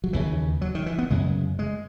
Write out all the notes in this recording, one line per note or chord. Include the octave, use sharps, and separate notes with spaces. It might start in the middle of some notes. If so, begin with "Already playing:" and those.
F#3
D#2 C#3 E3
F#3
D#3
E3
B3
F#2 C#3 G#3
G#3